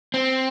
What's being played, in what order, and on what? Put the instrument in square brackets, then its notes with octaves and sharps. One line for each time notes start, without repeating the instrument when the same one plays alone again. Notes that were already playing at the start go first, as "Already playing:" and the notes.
[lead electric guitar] C4